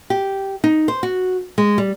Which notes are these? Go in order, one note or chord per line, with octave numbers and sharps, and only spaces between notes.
G4
D#4
C5
F#4
G#3
G3